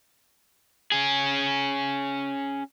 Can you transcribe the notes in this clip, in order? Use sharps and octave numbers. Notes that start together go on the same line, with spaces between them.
C#4 G#4